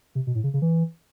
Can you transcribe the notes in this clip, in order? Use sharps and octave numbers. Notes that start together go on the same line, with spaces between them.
C3
B2
A2
C#3
C#3
E3